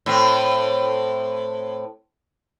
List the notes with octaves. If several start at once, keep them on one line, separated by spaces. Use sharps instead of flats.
A2 C4